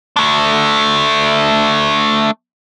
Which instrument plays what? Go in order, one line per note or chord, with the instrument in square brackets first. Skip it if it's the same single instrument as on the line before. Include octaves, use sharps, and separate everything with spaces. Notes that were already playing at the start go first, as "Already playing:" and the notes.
[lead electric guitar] A3 D4